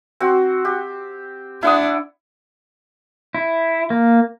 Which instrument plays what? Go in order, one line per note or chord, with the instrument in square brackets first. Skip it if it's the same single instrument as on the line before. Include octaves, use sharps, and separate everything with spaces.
[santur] C4 F#4
G4
[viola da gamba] D4 [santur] E4 F#5 D#6
[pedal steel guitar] E4
A#3